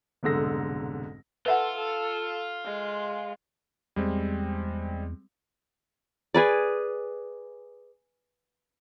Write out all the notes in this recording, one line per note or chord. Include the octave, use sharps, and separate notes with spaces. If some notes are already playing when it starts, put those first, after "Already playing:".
F1 B1 G#2 D3 E6 A#6
F4 A4 B4 E5 F#5
A4
G#3
E2 G3 G#3 C4
G#4 B4 D5